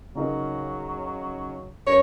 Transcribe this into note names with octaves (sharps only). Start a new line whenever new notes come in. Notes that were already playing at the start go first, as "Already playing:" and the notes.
C#3 F#3 D#4 A#4
F#2 B4 C#5 A#6